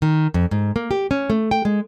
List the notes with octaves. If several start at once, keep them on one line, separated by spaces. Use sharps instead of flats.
D#3
F2
G#2
A#3
G4
C#4
A3
G5
G#3